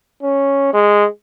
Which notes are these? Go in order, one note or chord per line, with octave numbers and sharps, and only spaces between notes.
C#4
G#3